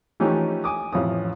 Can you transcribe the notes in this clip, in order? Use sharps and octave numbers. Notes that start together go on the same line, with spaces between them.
E3 F3 A3 C#4 D#4 G4
G#5 D6 D#6
A1 F2 C#4 D#6